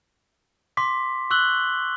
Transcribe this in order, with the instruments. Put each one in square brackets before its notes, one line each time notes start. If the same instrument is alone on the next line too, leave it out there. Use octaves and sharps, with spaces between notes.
[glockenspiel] C6 D6 B6
C#6 E6 F#6 F#7 G7